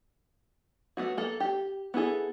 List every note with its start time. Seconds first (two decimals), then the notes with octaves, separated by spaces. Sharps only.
0.97 A3 B3 F#4
1.17 A#3 A4
1.40 G4
1.94 B3 E4 G#4 A4